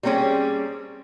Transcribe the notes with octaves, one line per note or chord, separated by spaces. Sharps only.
G3 A#3 C4 C#4 G#4